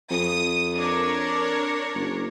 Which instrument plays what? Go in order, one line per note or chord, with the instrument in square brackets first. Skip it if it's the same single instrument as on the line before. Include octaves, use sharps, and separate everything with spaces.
[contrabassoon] F2 [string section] D#6
[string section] D4 A#4 C#5
[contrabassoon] F#1